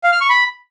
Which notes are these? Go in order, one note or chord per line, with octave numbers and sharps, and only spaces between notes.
F5
F6
C#6
B5